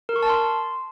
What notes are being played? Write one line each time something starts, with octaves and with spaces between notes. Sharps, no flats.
A#4
C#6
A5
C6